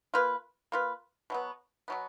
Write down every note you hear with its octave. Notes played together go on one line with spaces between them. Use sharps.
A#3 F4 B4
A#3 F4 B4
B2 F#3 B3
B2 F#3 B3